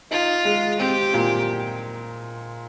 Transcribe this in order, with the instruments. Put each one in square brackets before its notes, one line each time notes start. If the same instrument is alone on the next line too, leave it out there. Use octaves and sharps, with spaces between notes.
[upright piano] D#4 [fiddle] F4
[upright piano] G#3
[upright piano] C4 [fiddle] G4
[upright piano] A#2